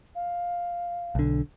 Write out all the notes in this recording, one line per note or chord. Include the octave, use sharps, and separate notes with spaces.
F5
B1 D3